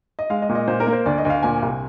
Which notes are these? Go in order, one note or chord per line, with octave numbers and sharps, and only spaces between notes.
D#5
G#3 F5
D#5
A#2
D#5
A#2 C5
A#4
A#3
C5
D2 D5
D#5
D2
F5
A#2 G#5
C2